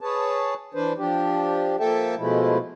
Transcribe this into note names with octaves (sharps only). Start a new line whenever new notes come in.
G#4 B4 C#5 A5
E3 D4 B4 C5
F3 D4 G4
F3 A#3 A4 E5 G5 A5
B2 F3 G#3 A3 E4